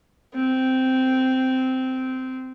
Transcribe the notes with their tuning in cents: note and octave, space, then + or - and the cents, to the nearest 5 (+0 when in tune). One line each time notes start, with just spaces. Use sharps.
C4 -10